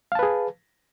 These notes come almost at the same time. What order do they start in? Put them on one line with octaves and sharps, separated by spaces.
F5 A5 B4 G#4